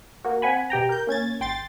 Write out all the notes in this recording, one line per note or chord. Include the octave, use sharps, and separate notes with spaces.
A#3 F#4
C4 F#5 G#5 B5
B2 G4 G5 A#5
A#4 G6
A#3 C#4 G#6 A6
G#1 G5 C6 A6